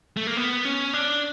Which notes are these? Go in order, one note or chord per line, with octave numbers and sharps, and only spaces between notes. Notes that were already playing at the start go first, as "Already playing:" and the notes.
A3
A#3
B3
C#4
D4